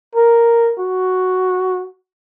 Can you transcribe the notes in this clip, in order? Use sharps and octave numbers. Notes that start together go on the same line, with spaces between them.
A#4
F#4